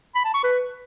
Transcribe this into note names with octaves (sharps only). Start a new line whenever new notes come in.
B5
A5
C#6
B4